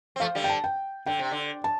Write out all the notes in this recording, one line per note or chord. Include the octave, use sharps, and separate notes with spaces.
C4
F3 A3 F5
D3 G3
G5
A5
G5
D3 G5
C3
D3
A5